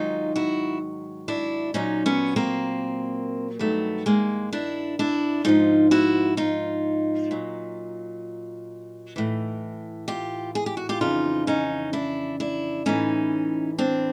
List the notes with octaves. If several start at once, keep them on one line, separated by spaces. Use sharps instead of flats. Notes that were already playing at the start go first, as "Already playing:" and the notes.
Already playing: G#2 D#3 F#3 D#4 F4
E4 F#4
D4 E4
A#2 F#3 C#4 D#4
B3 C#4
A#3 C4
G2 D#3 F#3 A3 B3
G#3 A#3
D4 E4
D4 E4
G#2 F3 D#4 F4
E4 F#4
D#4 F4
A#2 F#3
A2 E3
F4 G4
G#4
G4
F#4
F4 G4
F2 C#3 E3 D#4 F4
C#4 D#4
D4 E4
D4 E4
A2 E3 C#4 D#4
C4 D4